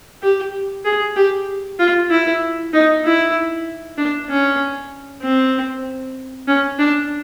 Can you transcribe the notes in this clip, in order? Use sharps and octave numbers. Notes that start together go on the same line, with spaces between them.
G4
G#4
G4
F4
E4
D#4
E4
D4
C#4
C4
C#4
D4